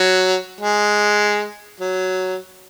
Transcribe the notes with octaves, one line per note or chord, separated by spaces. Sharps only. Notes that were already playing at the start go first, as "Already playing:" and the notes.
Already playing: F#3
G#3
F#3